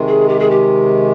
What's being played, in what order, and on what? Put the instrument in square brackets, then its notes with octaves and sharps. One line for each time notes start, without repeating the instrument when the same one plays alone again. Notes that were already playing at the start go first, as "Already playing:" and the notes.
Already playing: [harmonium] C3 D#3 G#3
[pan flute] G#4
G4
G#4
G4